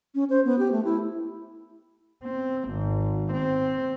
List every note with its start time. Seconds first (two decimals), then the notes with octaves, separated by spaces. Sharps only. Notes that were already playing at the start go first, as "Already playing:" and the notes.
0.15 C#4
0.30 C5
0.45 B3
0.59 G4
0.72 A3
0.85 E4
2.23 C4
2.70 G#1
3.33 C4